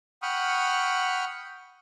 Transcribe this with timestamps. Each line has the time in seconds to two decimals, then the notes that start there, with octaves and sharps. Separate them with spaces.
0.22 F#5 G5 B5 C#6 D#6 F6